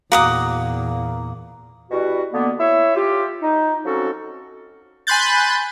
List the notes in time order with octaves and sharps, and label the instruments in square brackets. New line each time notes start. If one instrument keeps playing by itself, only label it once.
[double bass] E2 A#2 [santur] A#3 [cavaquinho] F#4 D6 D#6
[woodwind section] B2 G3 E4 F#4
D3 A#3 B3
E4 C#5 E5
F4 G4
D#4
F3 F#3 C4 C#4 F#4 A4
[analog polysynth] G#5 B5 C6 F#6 G6 A6